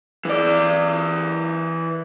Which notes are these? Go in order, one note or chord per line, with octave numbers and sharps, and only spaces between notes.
E3 D5